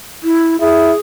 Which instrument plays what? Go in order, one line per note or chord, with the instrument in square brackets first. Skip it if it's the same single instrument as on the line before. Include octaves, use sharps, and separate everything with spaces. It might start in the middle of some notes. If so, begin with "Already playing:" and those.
[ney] E4
[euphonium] E4 [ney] G#4